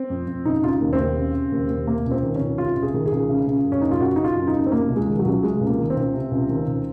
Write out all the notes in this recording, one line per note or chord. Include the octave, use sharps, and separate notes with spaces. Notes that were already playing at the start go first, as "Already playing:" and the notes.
Already playing: C4
F2
F2
C#3 D#4
C#3 F4
D#4
D#2
C4
D#2
C#3
C#3
D#2
D#2
C3 A#3
C#2
C4
D#3
C#4
C#2
C3 F4
C#2
G#4
D#3
G#4
C#2
C#3
C#3
F#2
C#4
F#2 D#4
F4
C#3 F#4
C#3 D#4
F4
F#2
D#4
F#2
C4
C3 A#3
C#2
G#3
D#3
F#3
C#2
C3 G#3
C#2
A#3
D#3
C4
C#2
C3
C#2
D#3
C#2